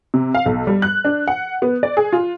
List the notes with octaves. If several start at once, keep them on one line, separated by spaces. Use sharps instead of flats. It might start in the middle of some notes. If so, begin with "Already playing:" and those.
C3
F5
B1
G3
F#6
D4
F#5
B3
D5
G#4
F4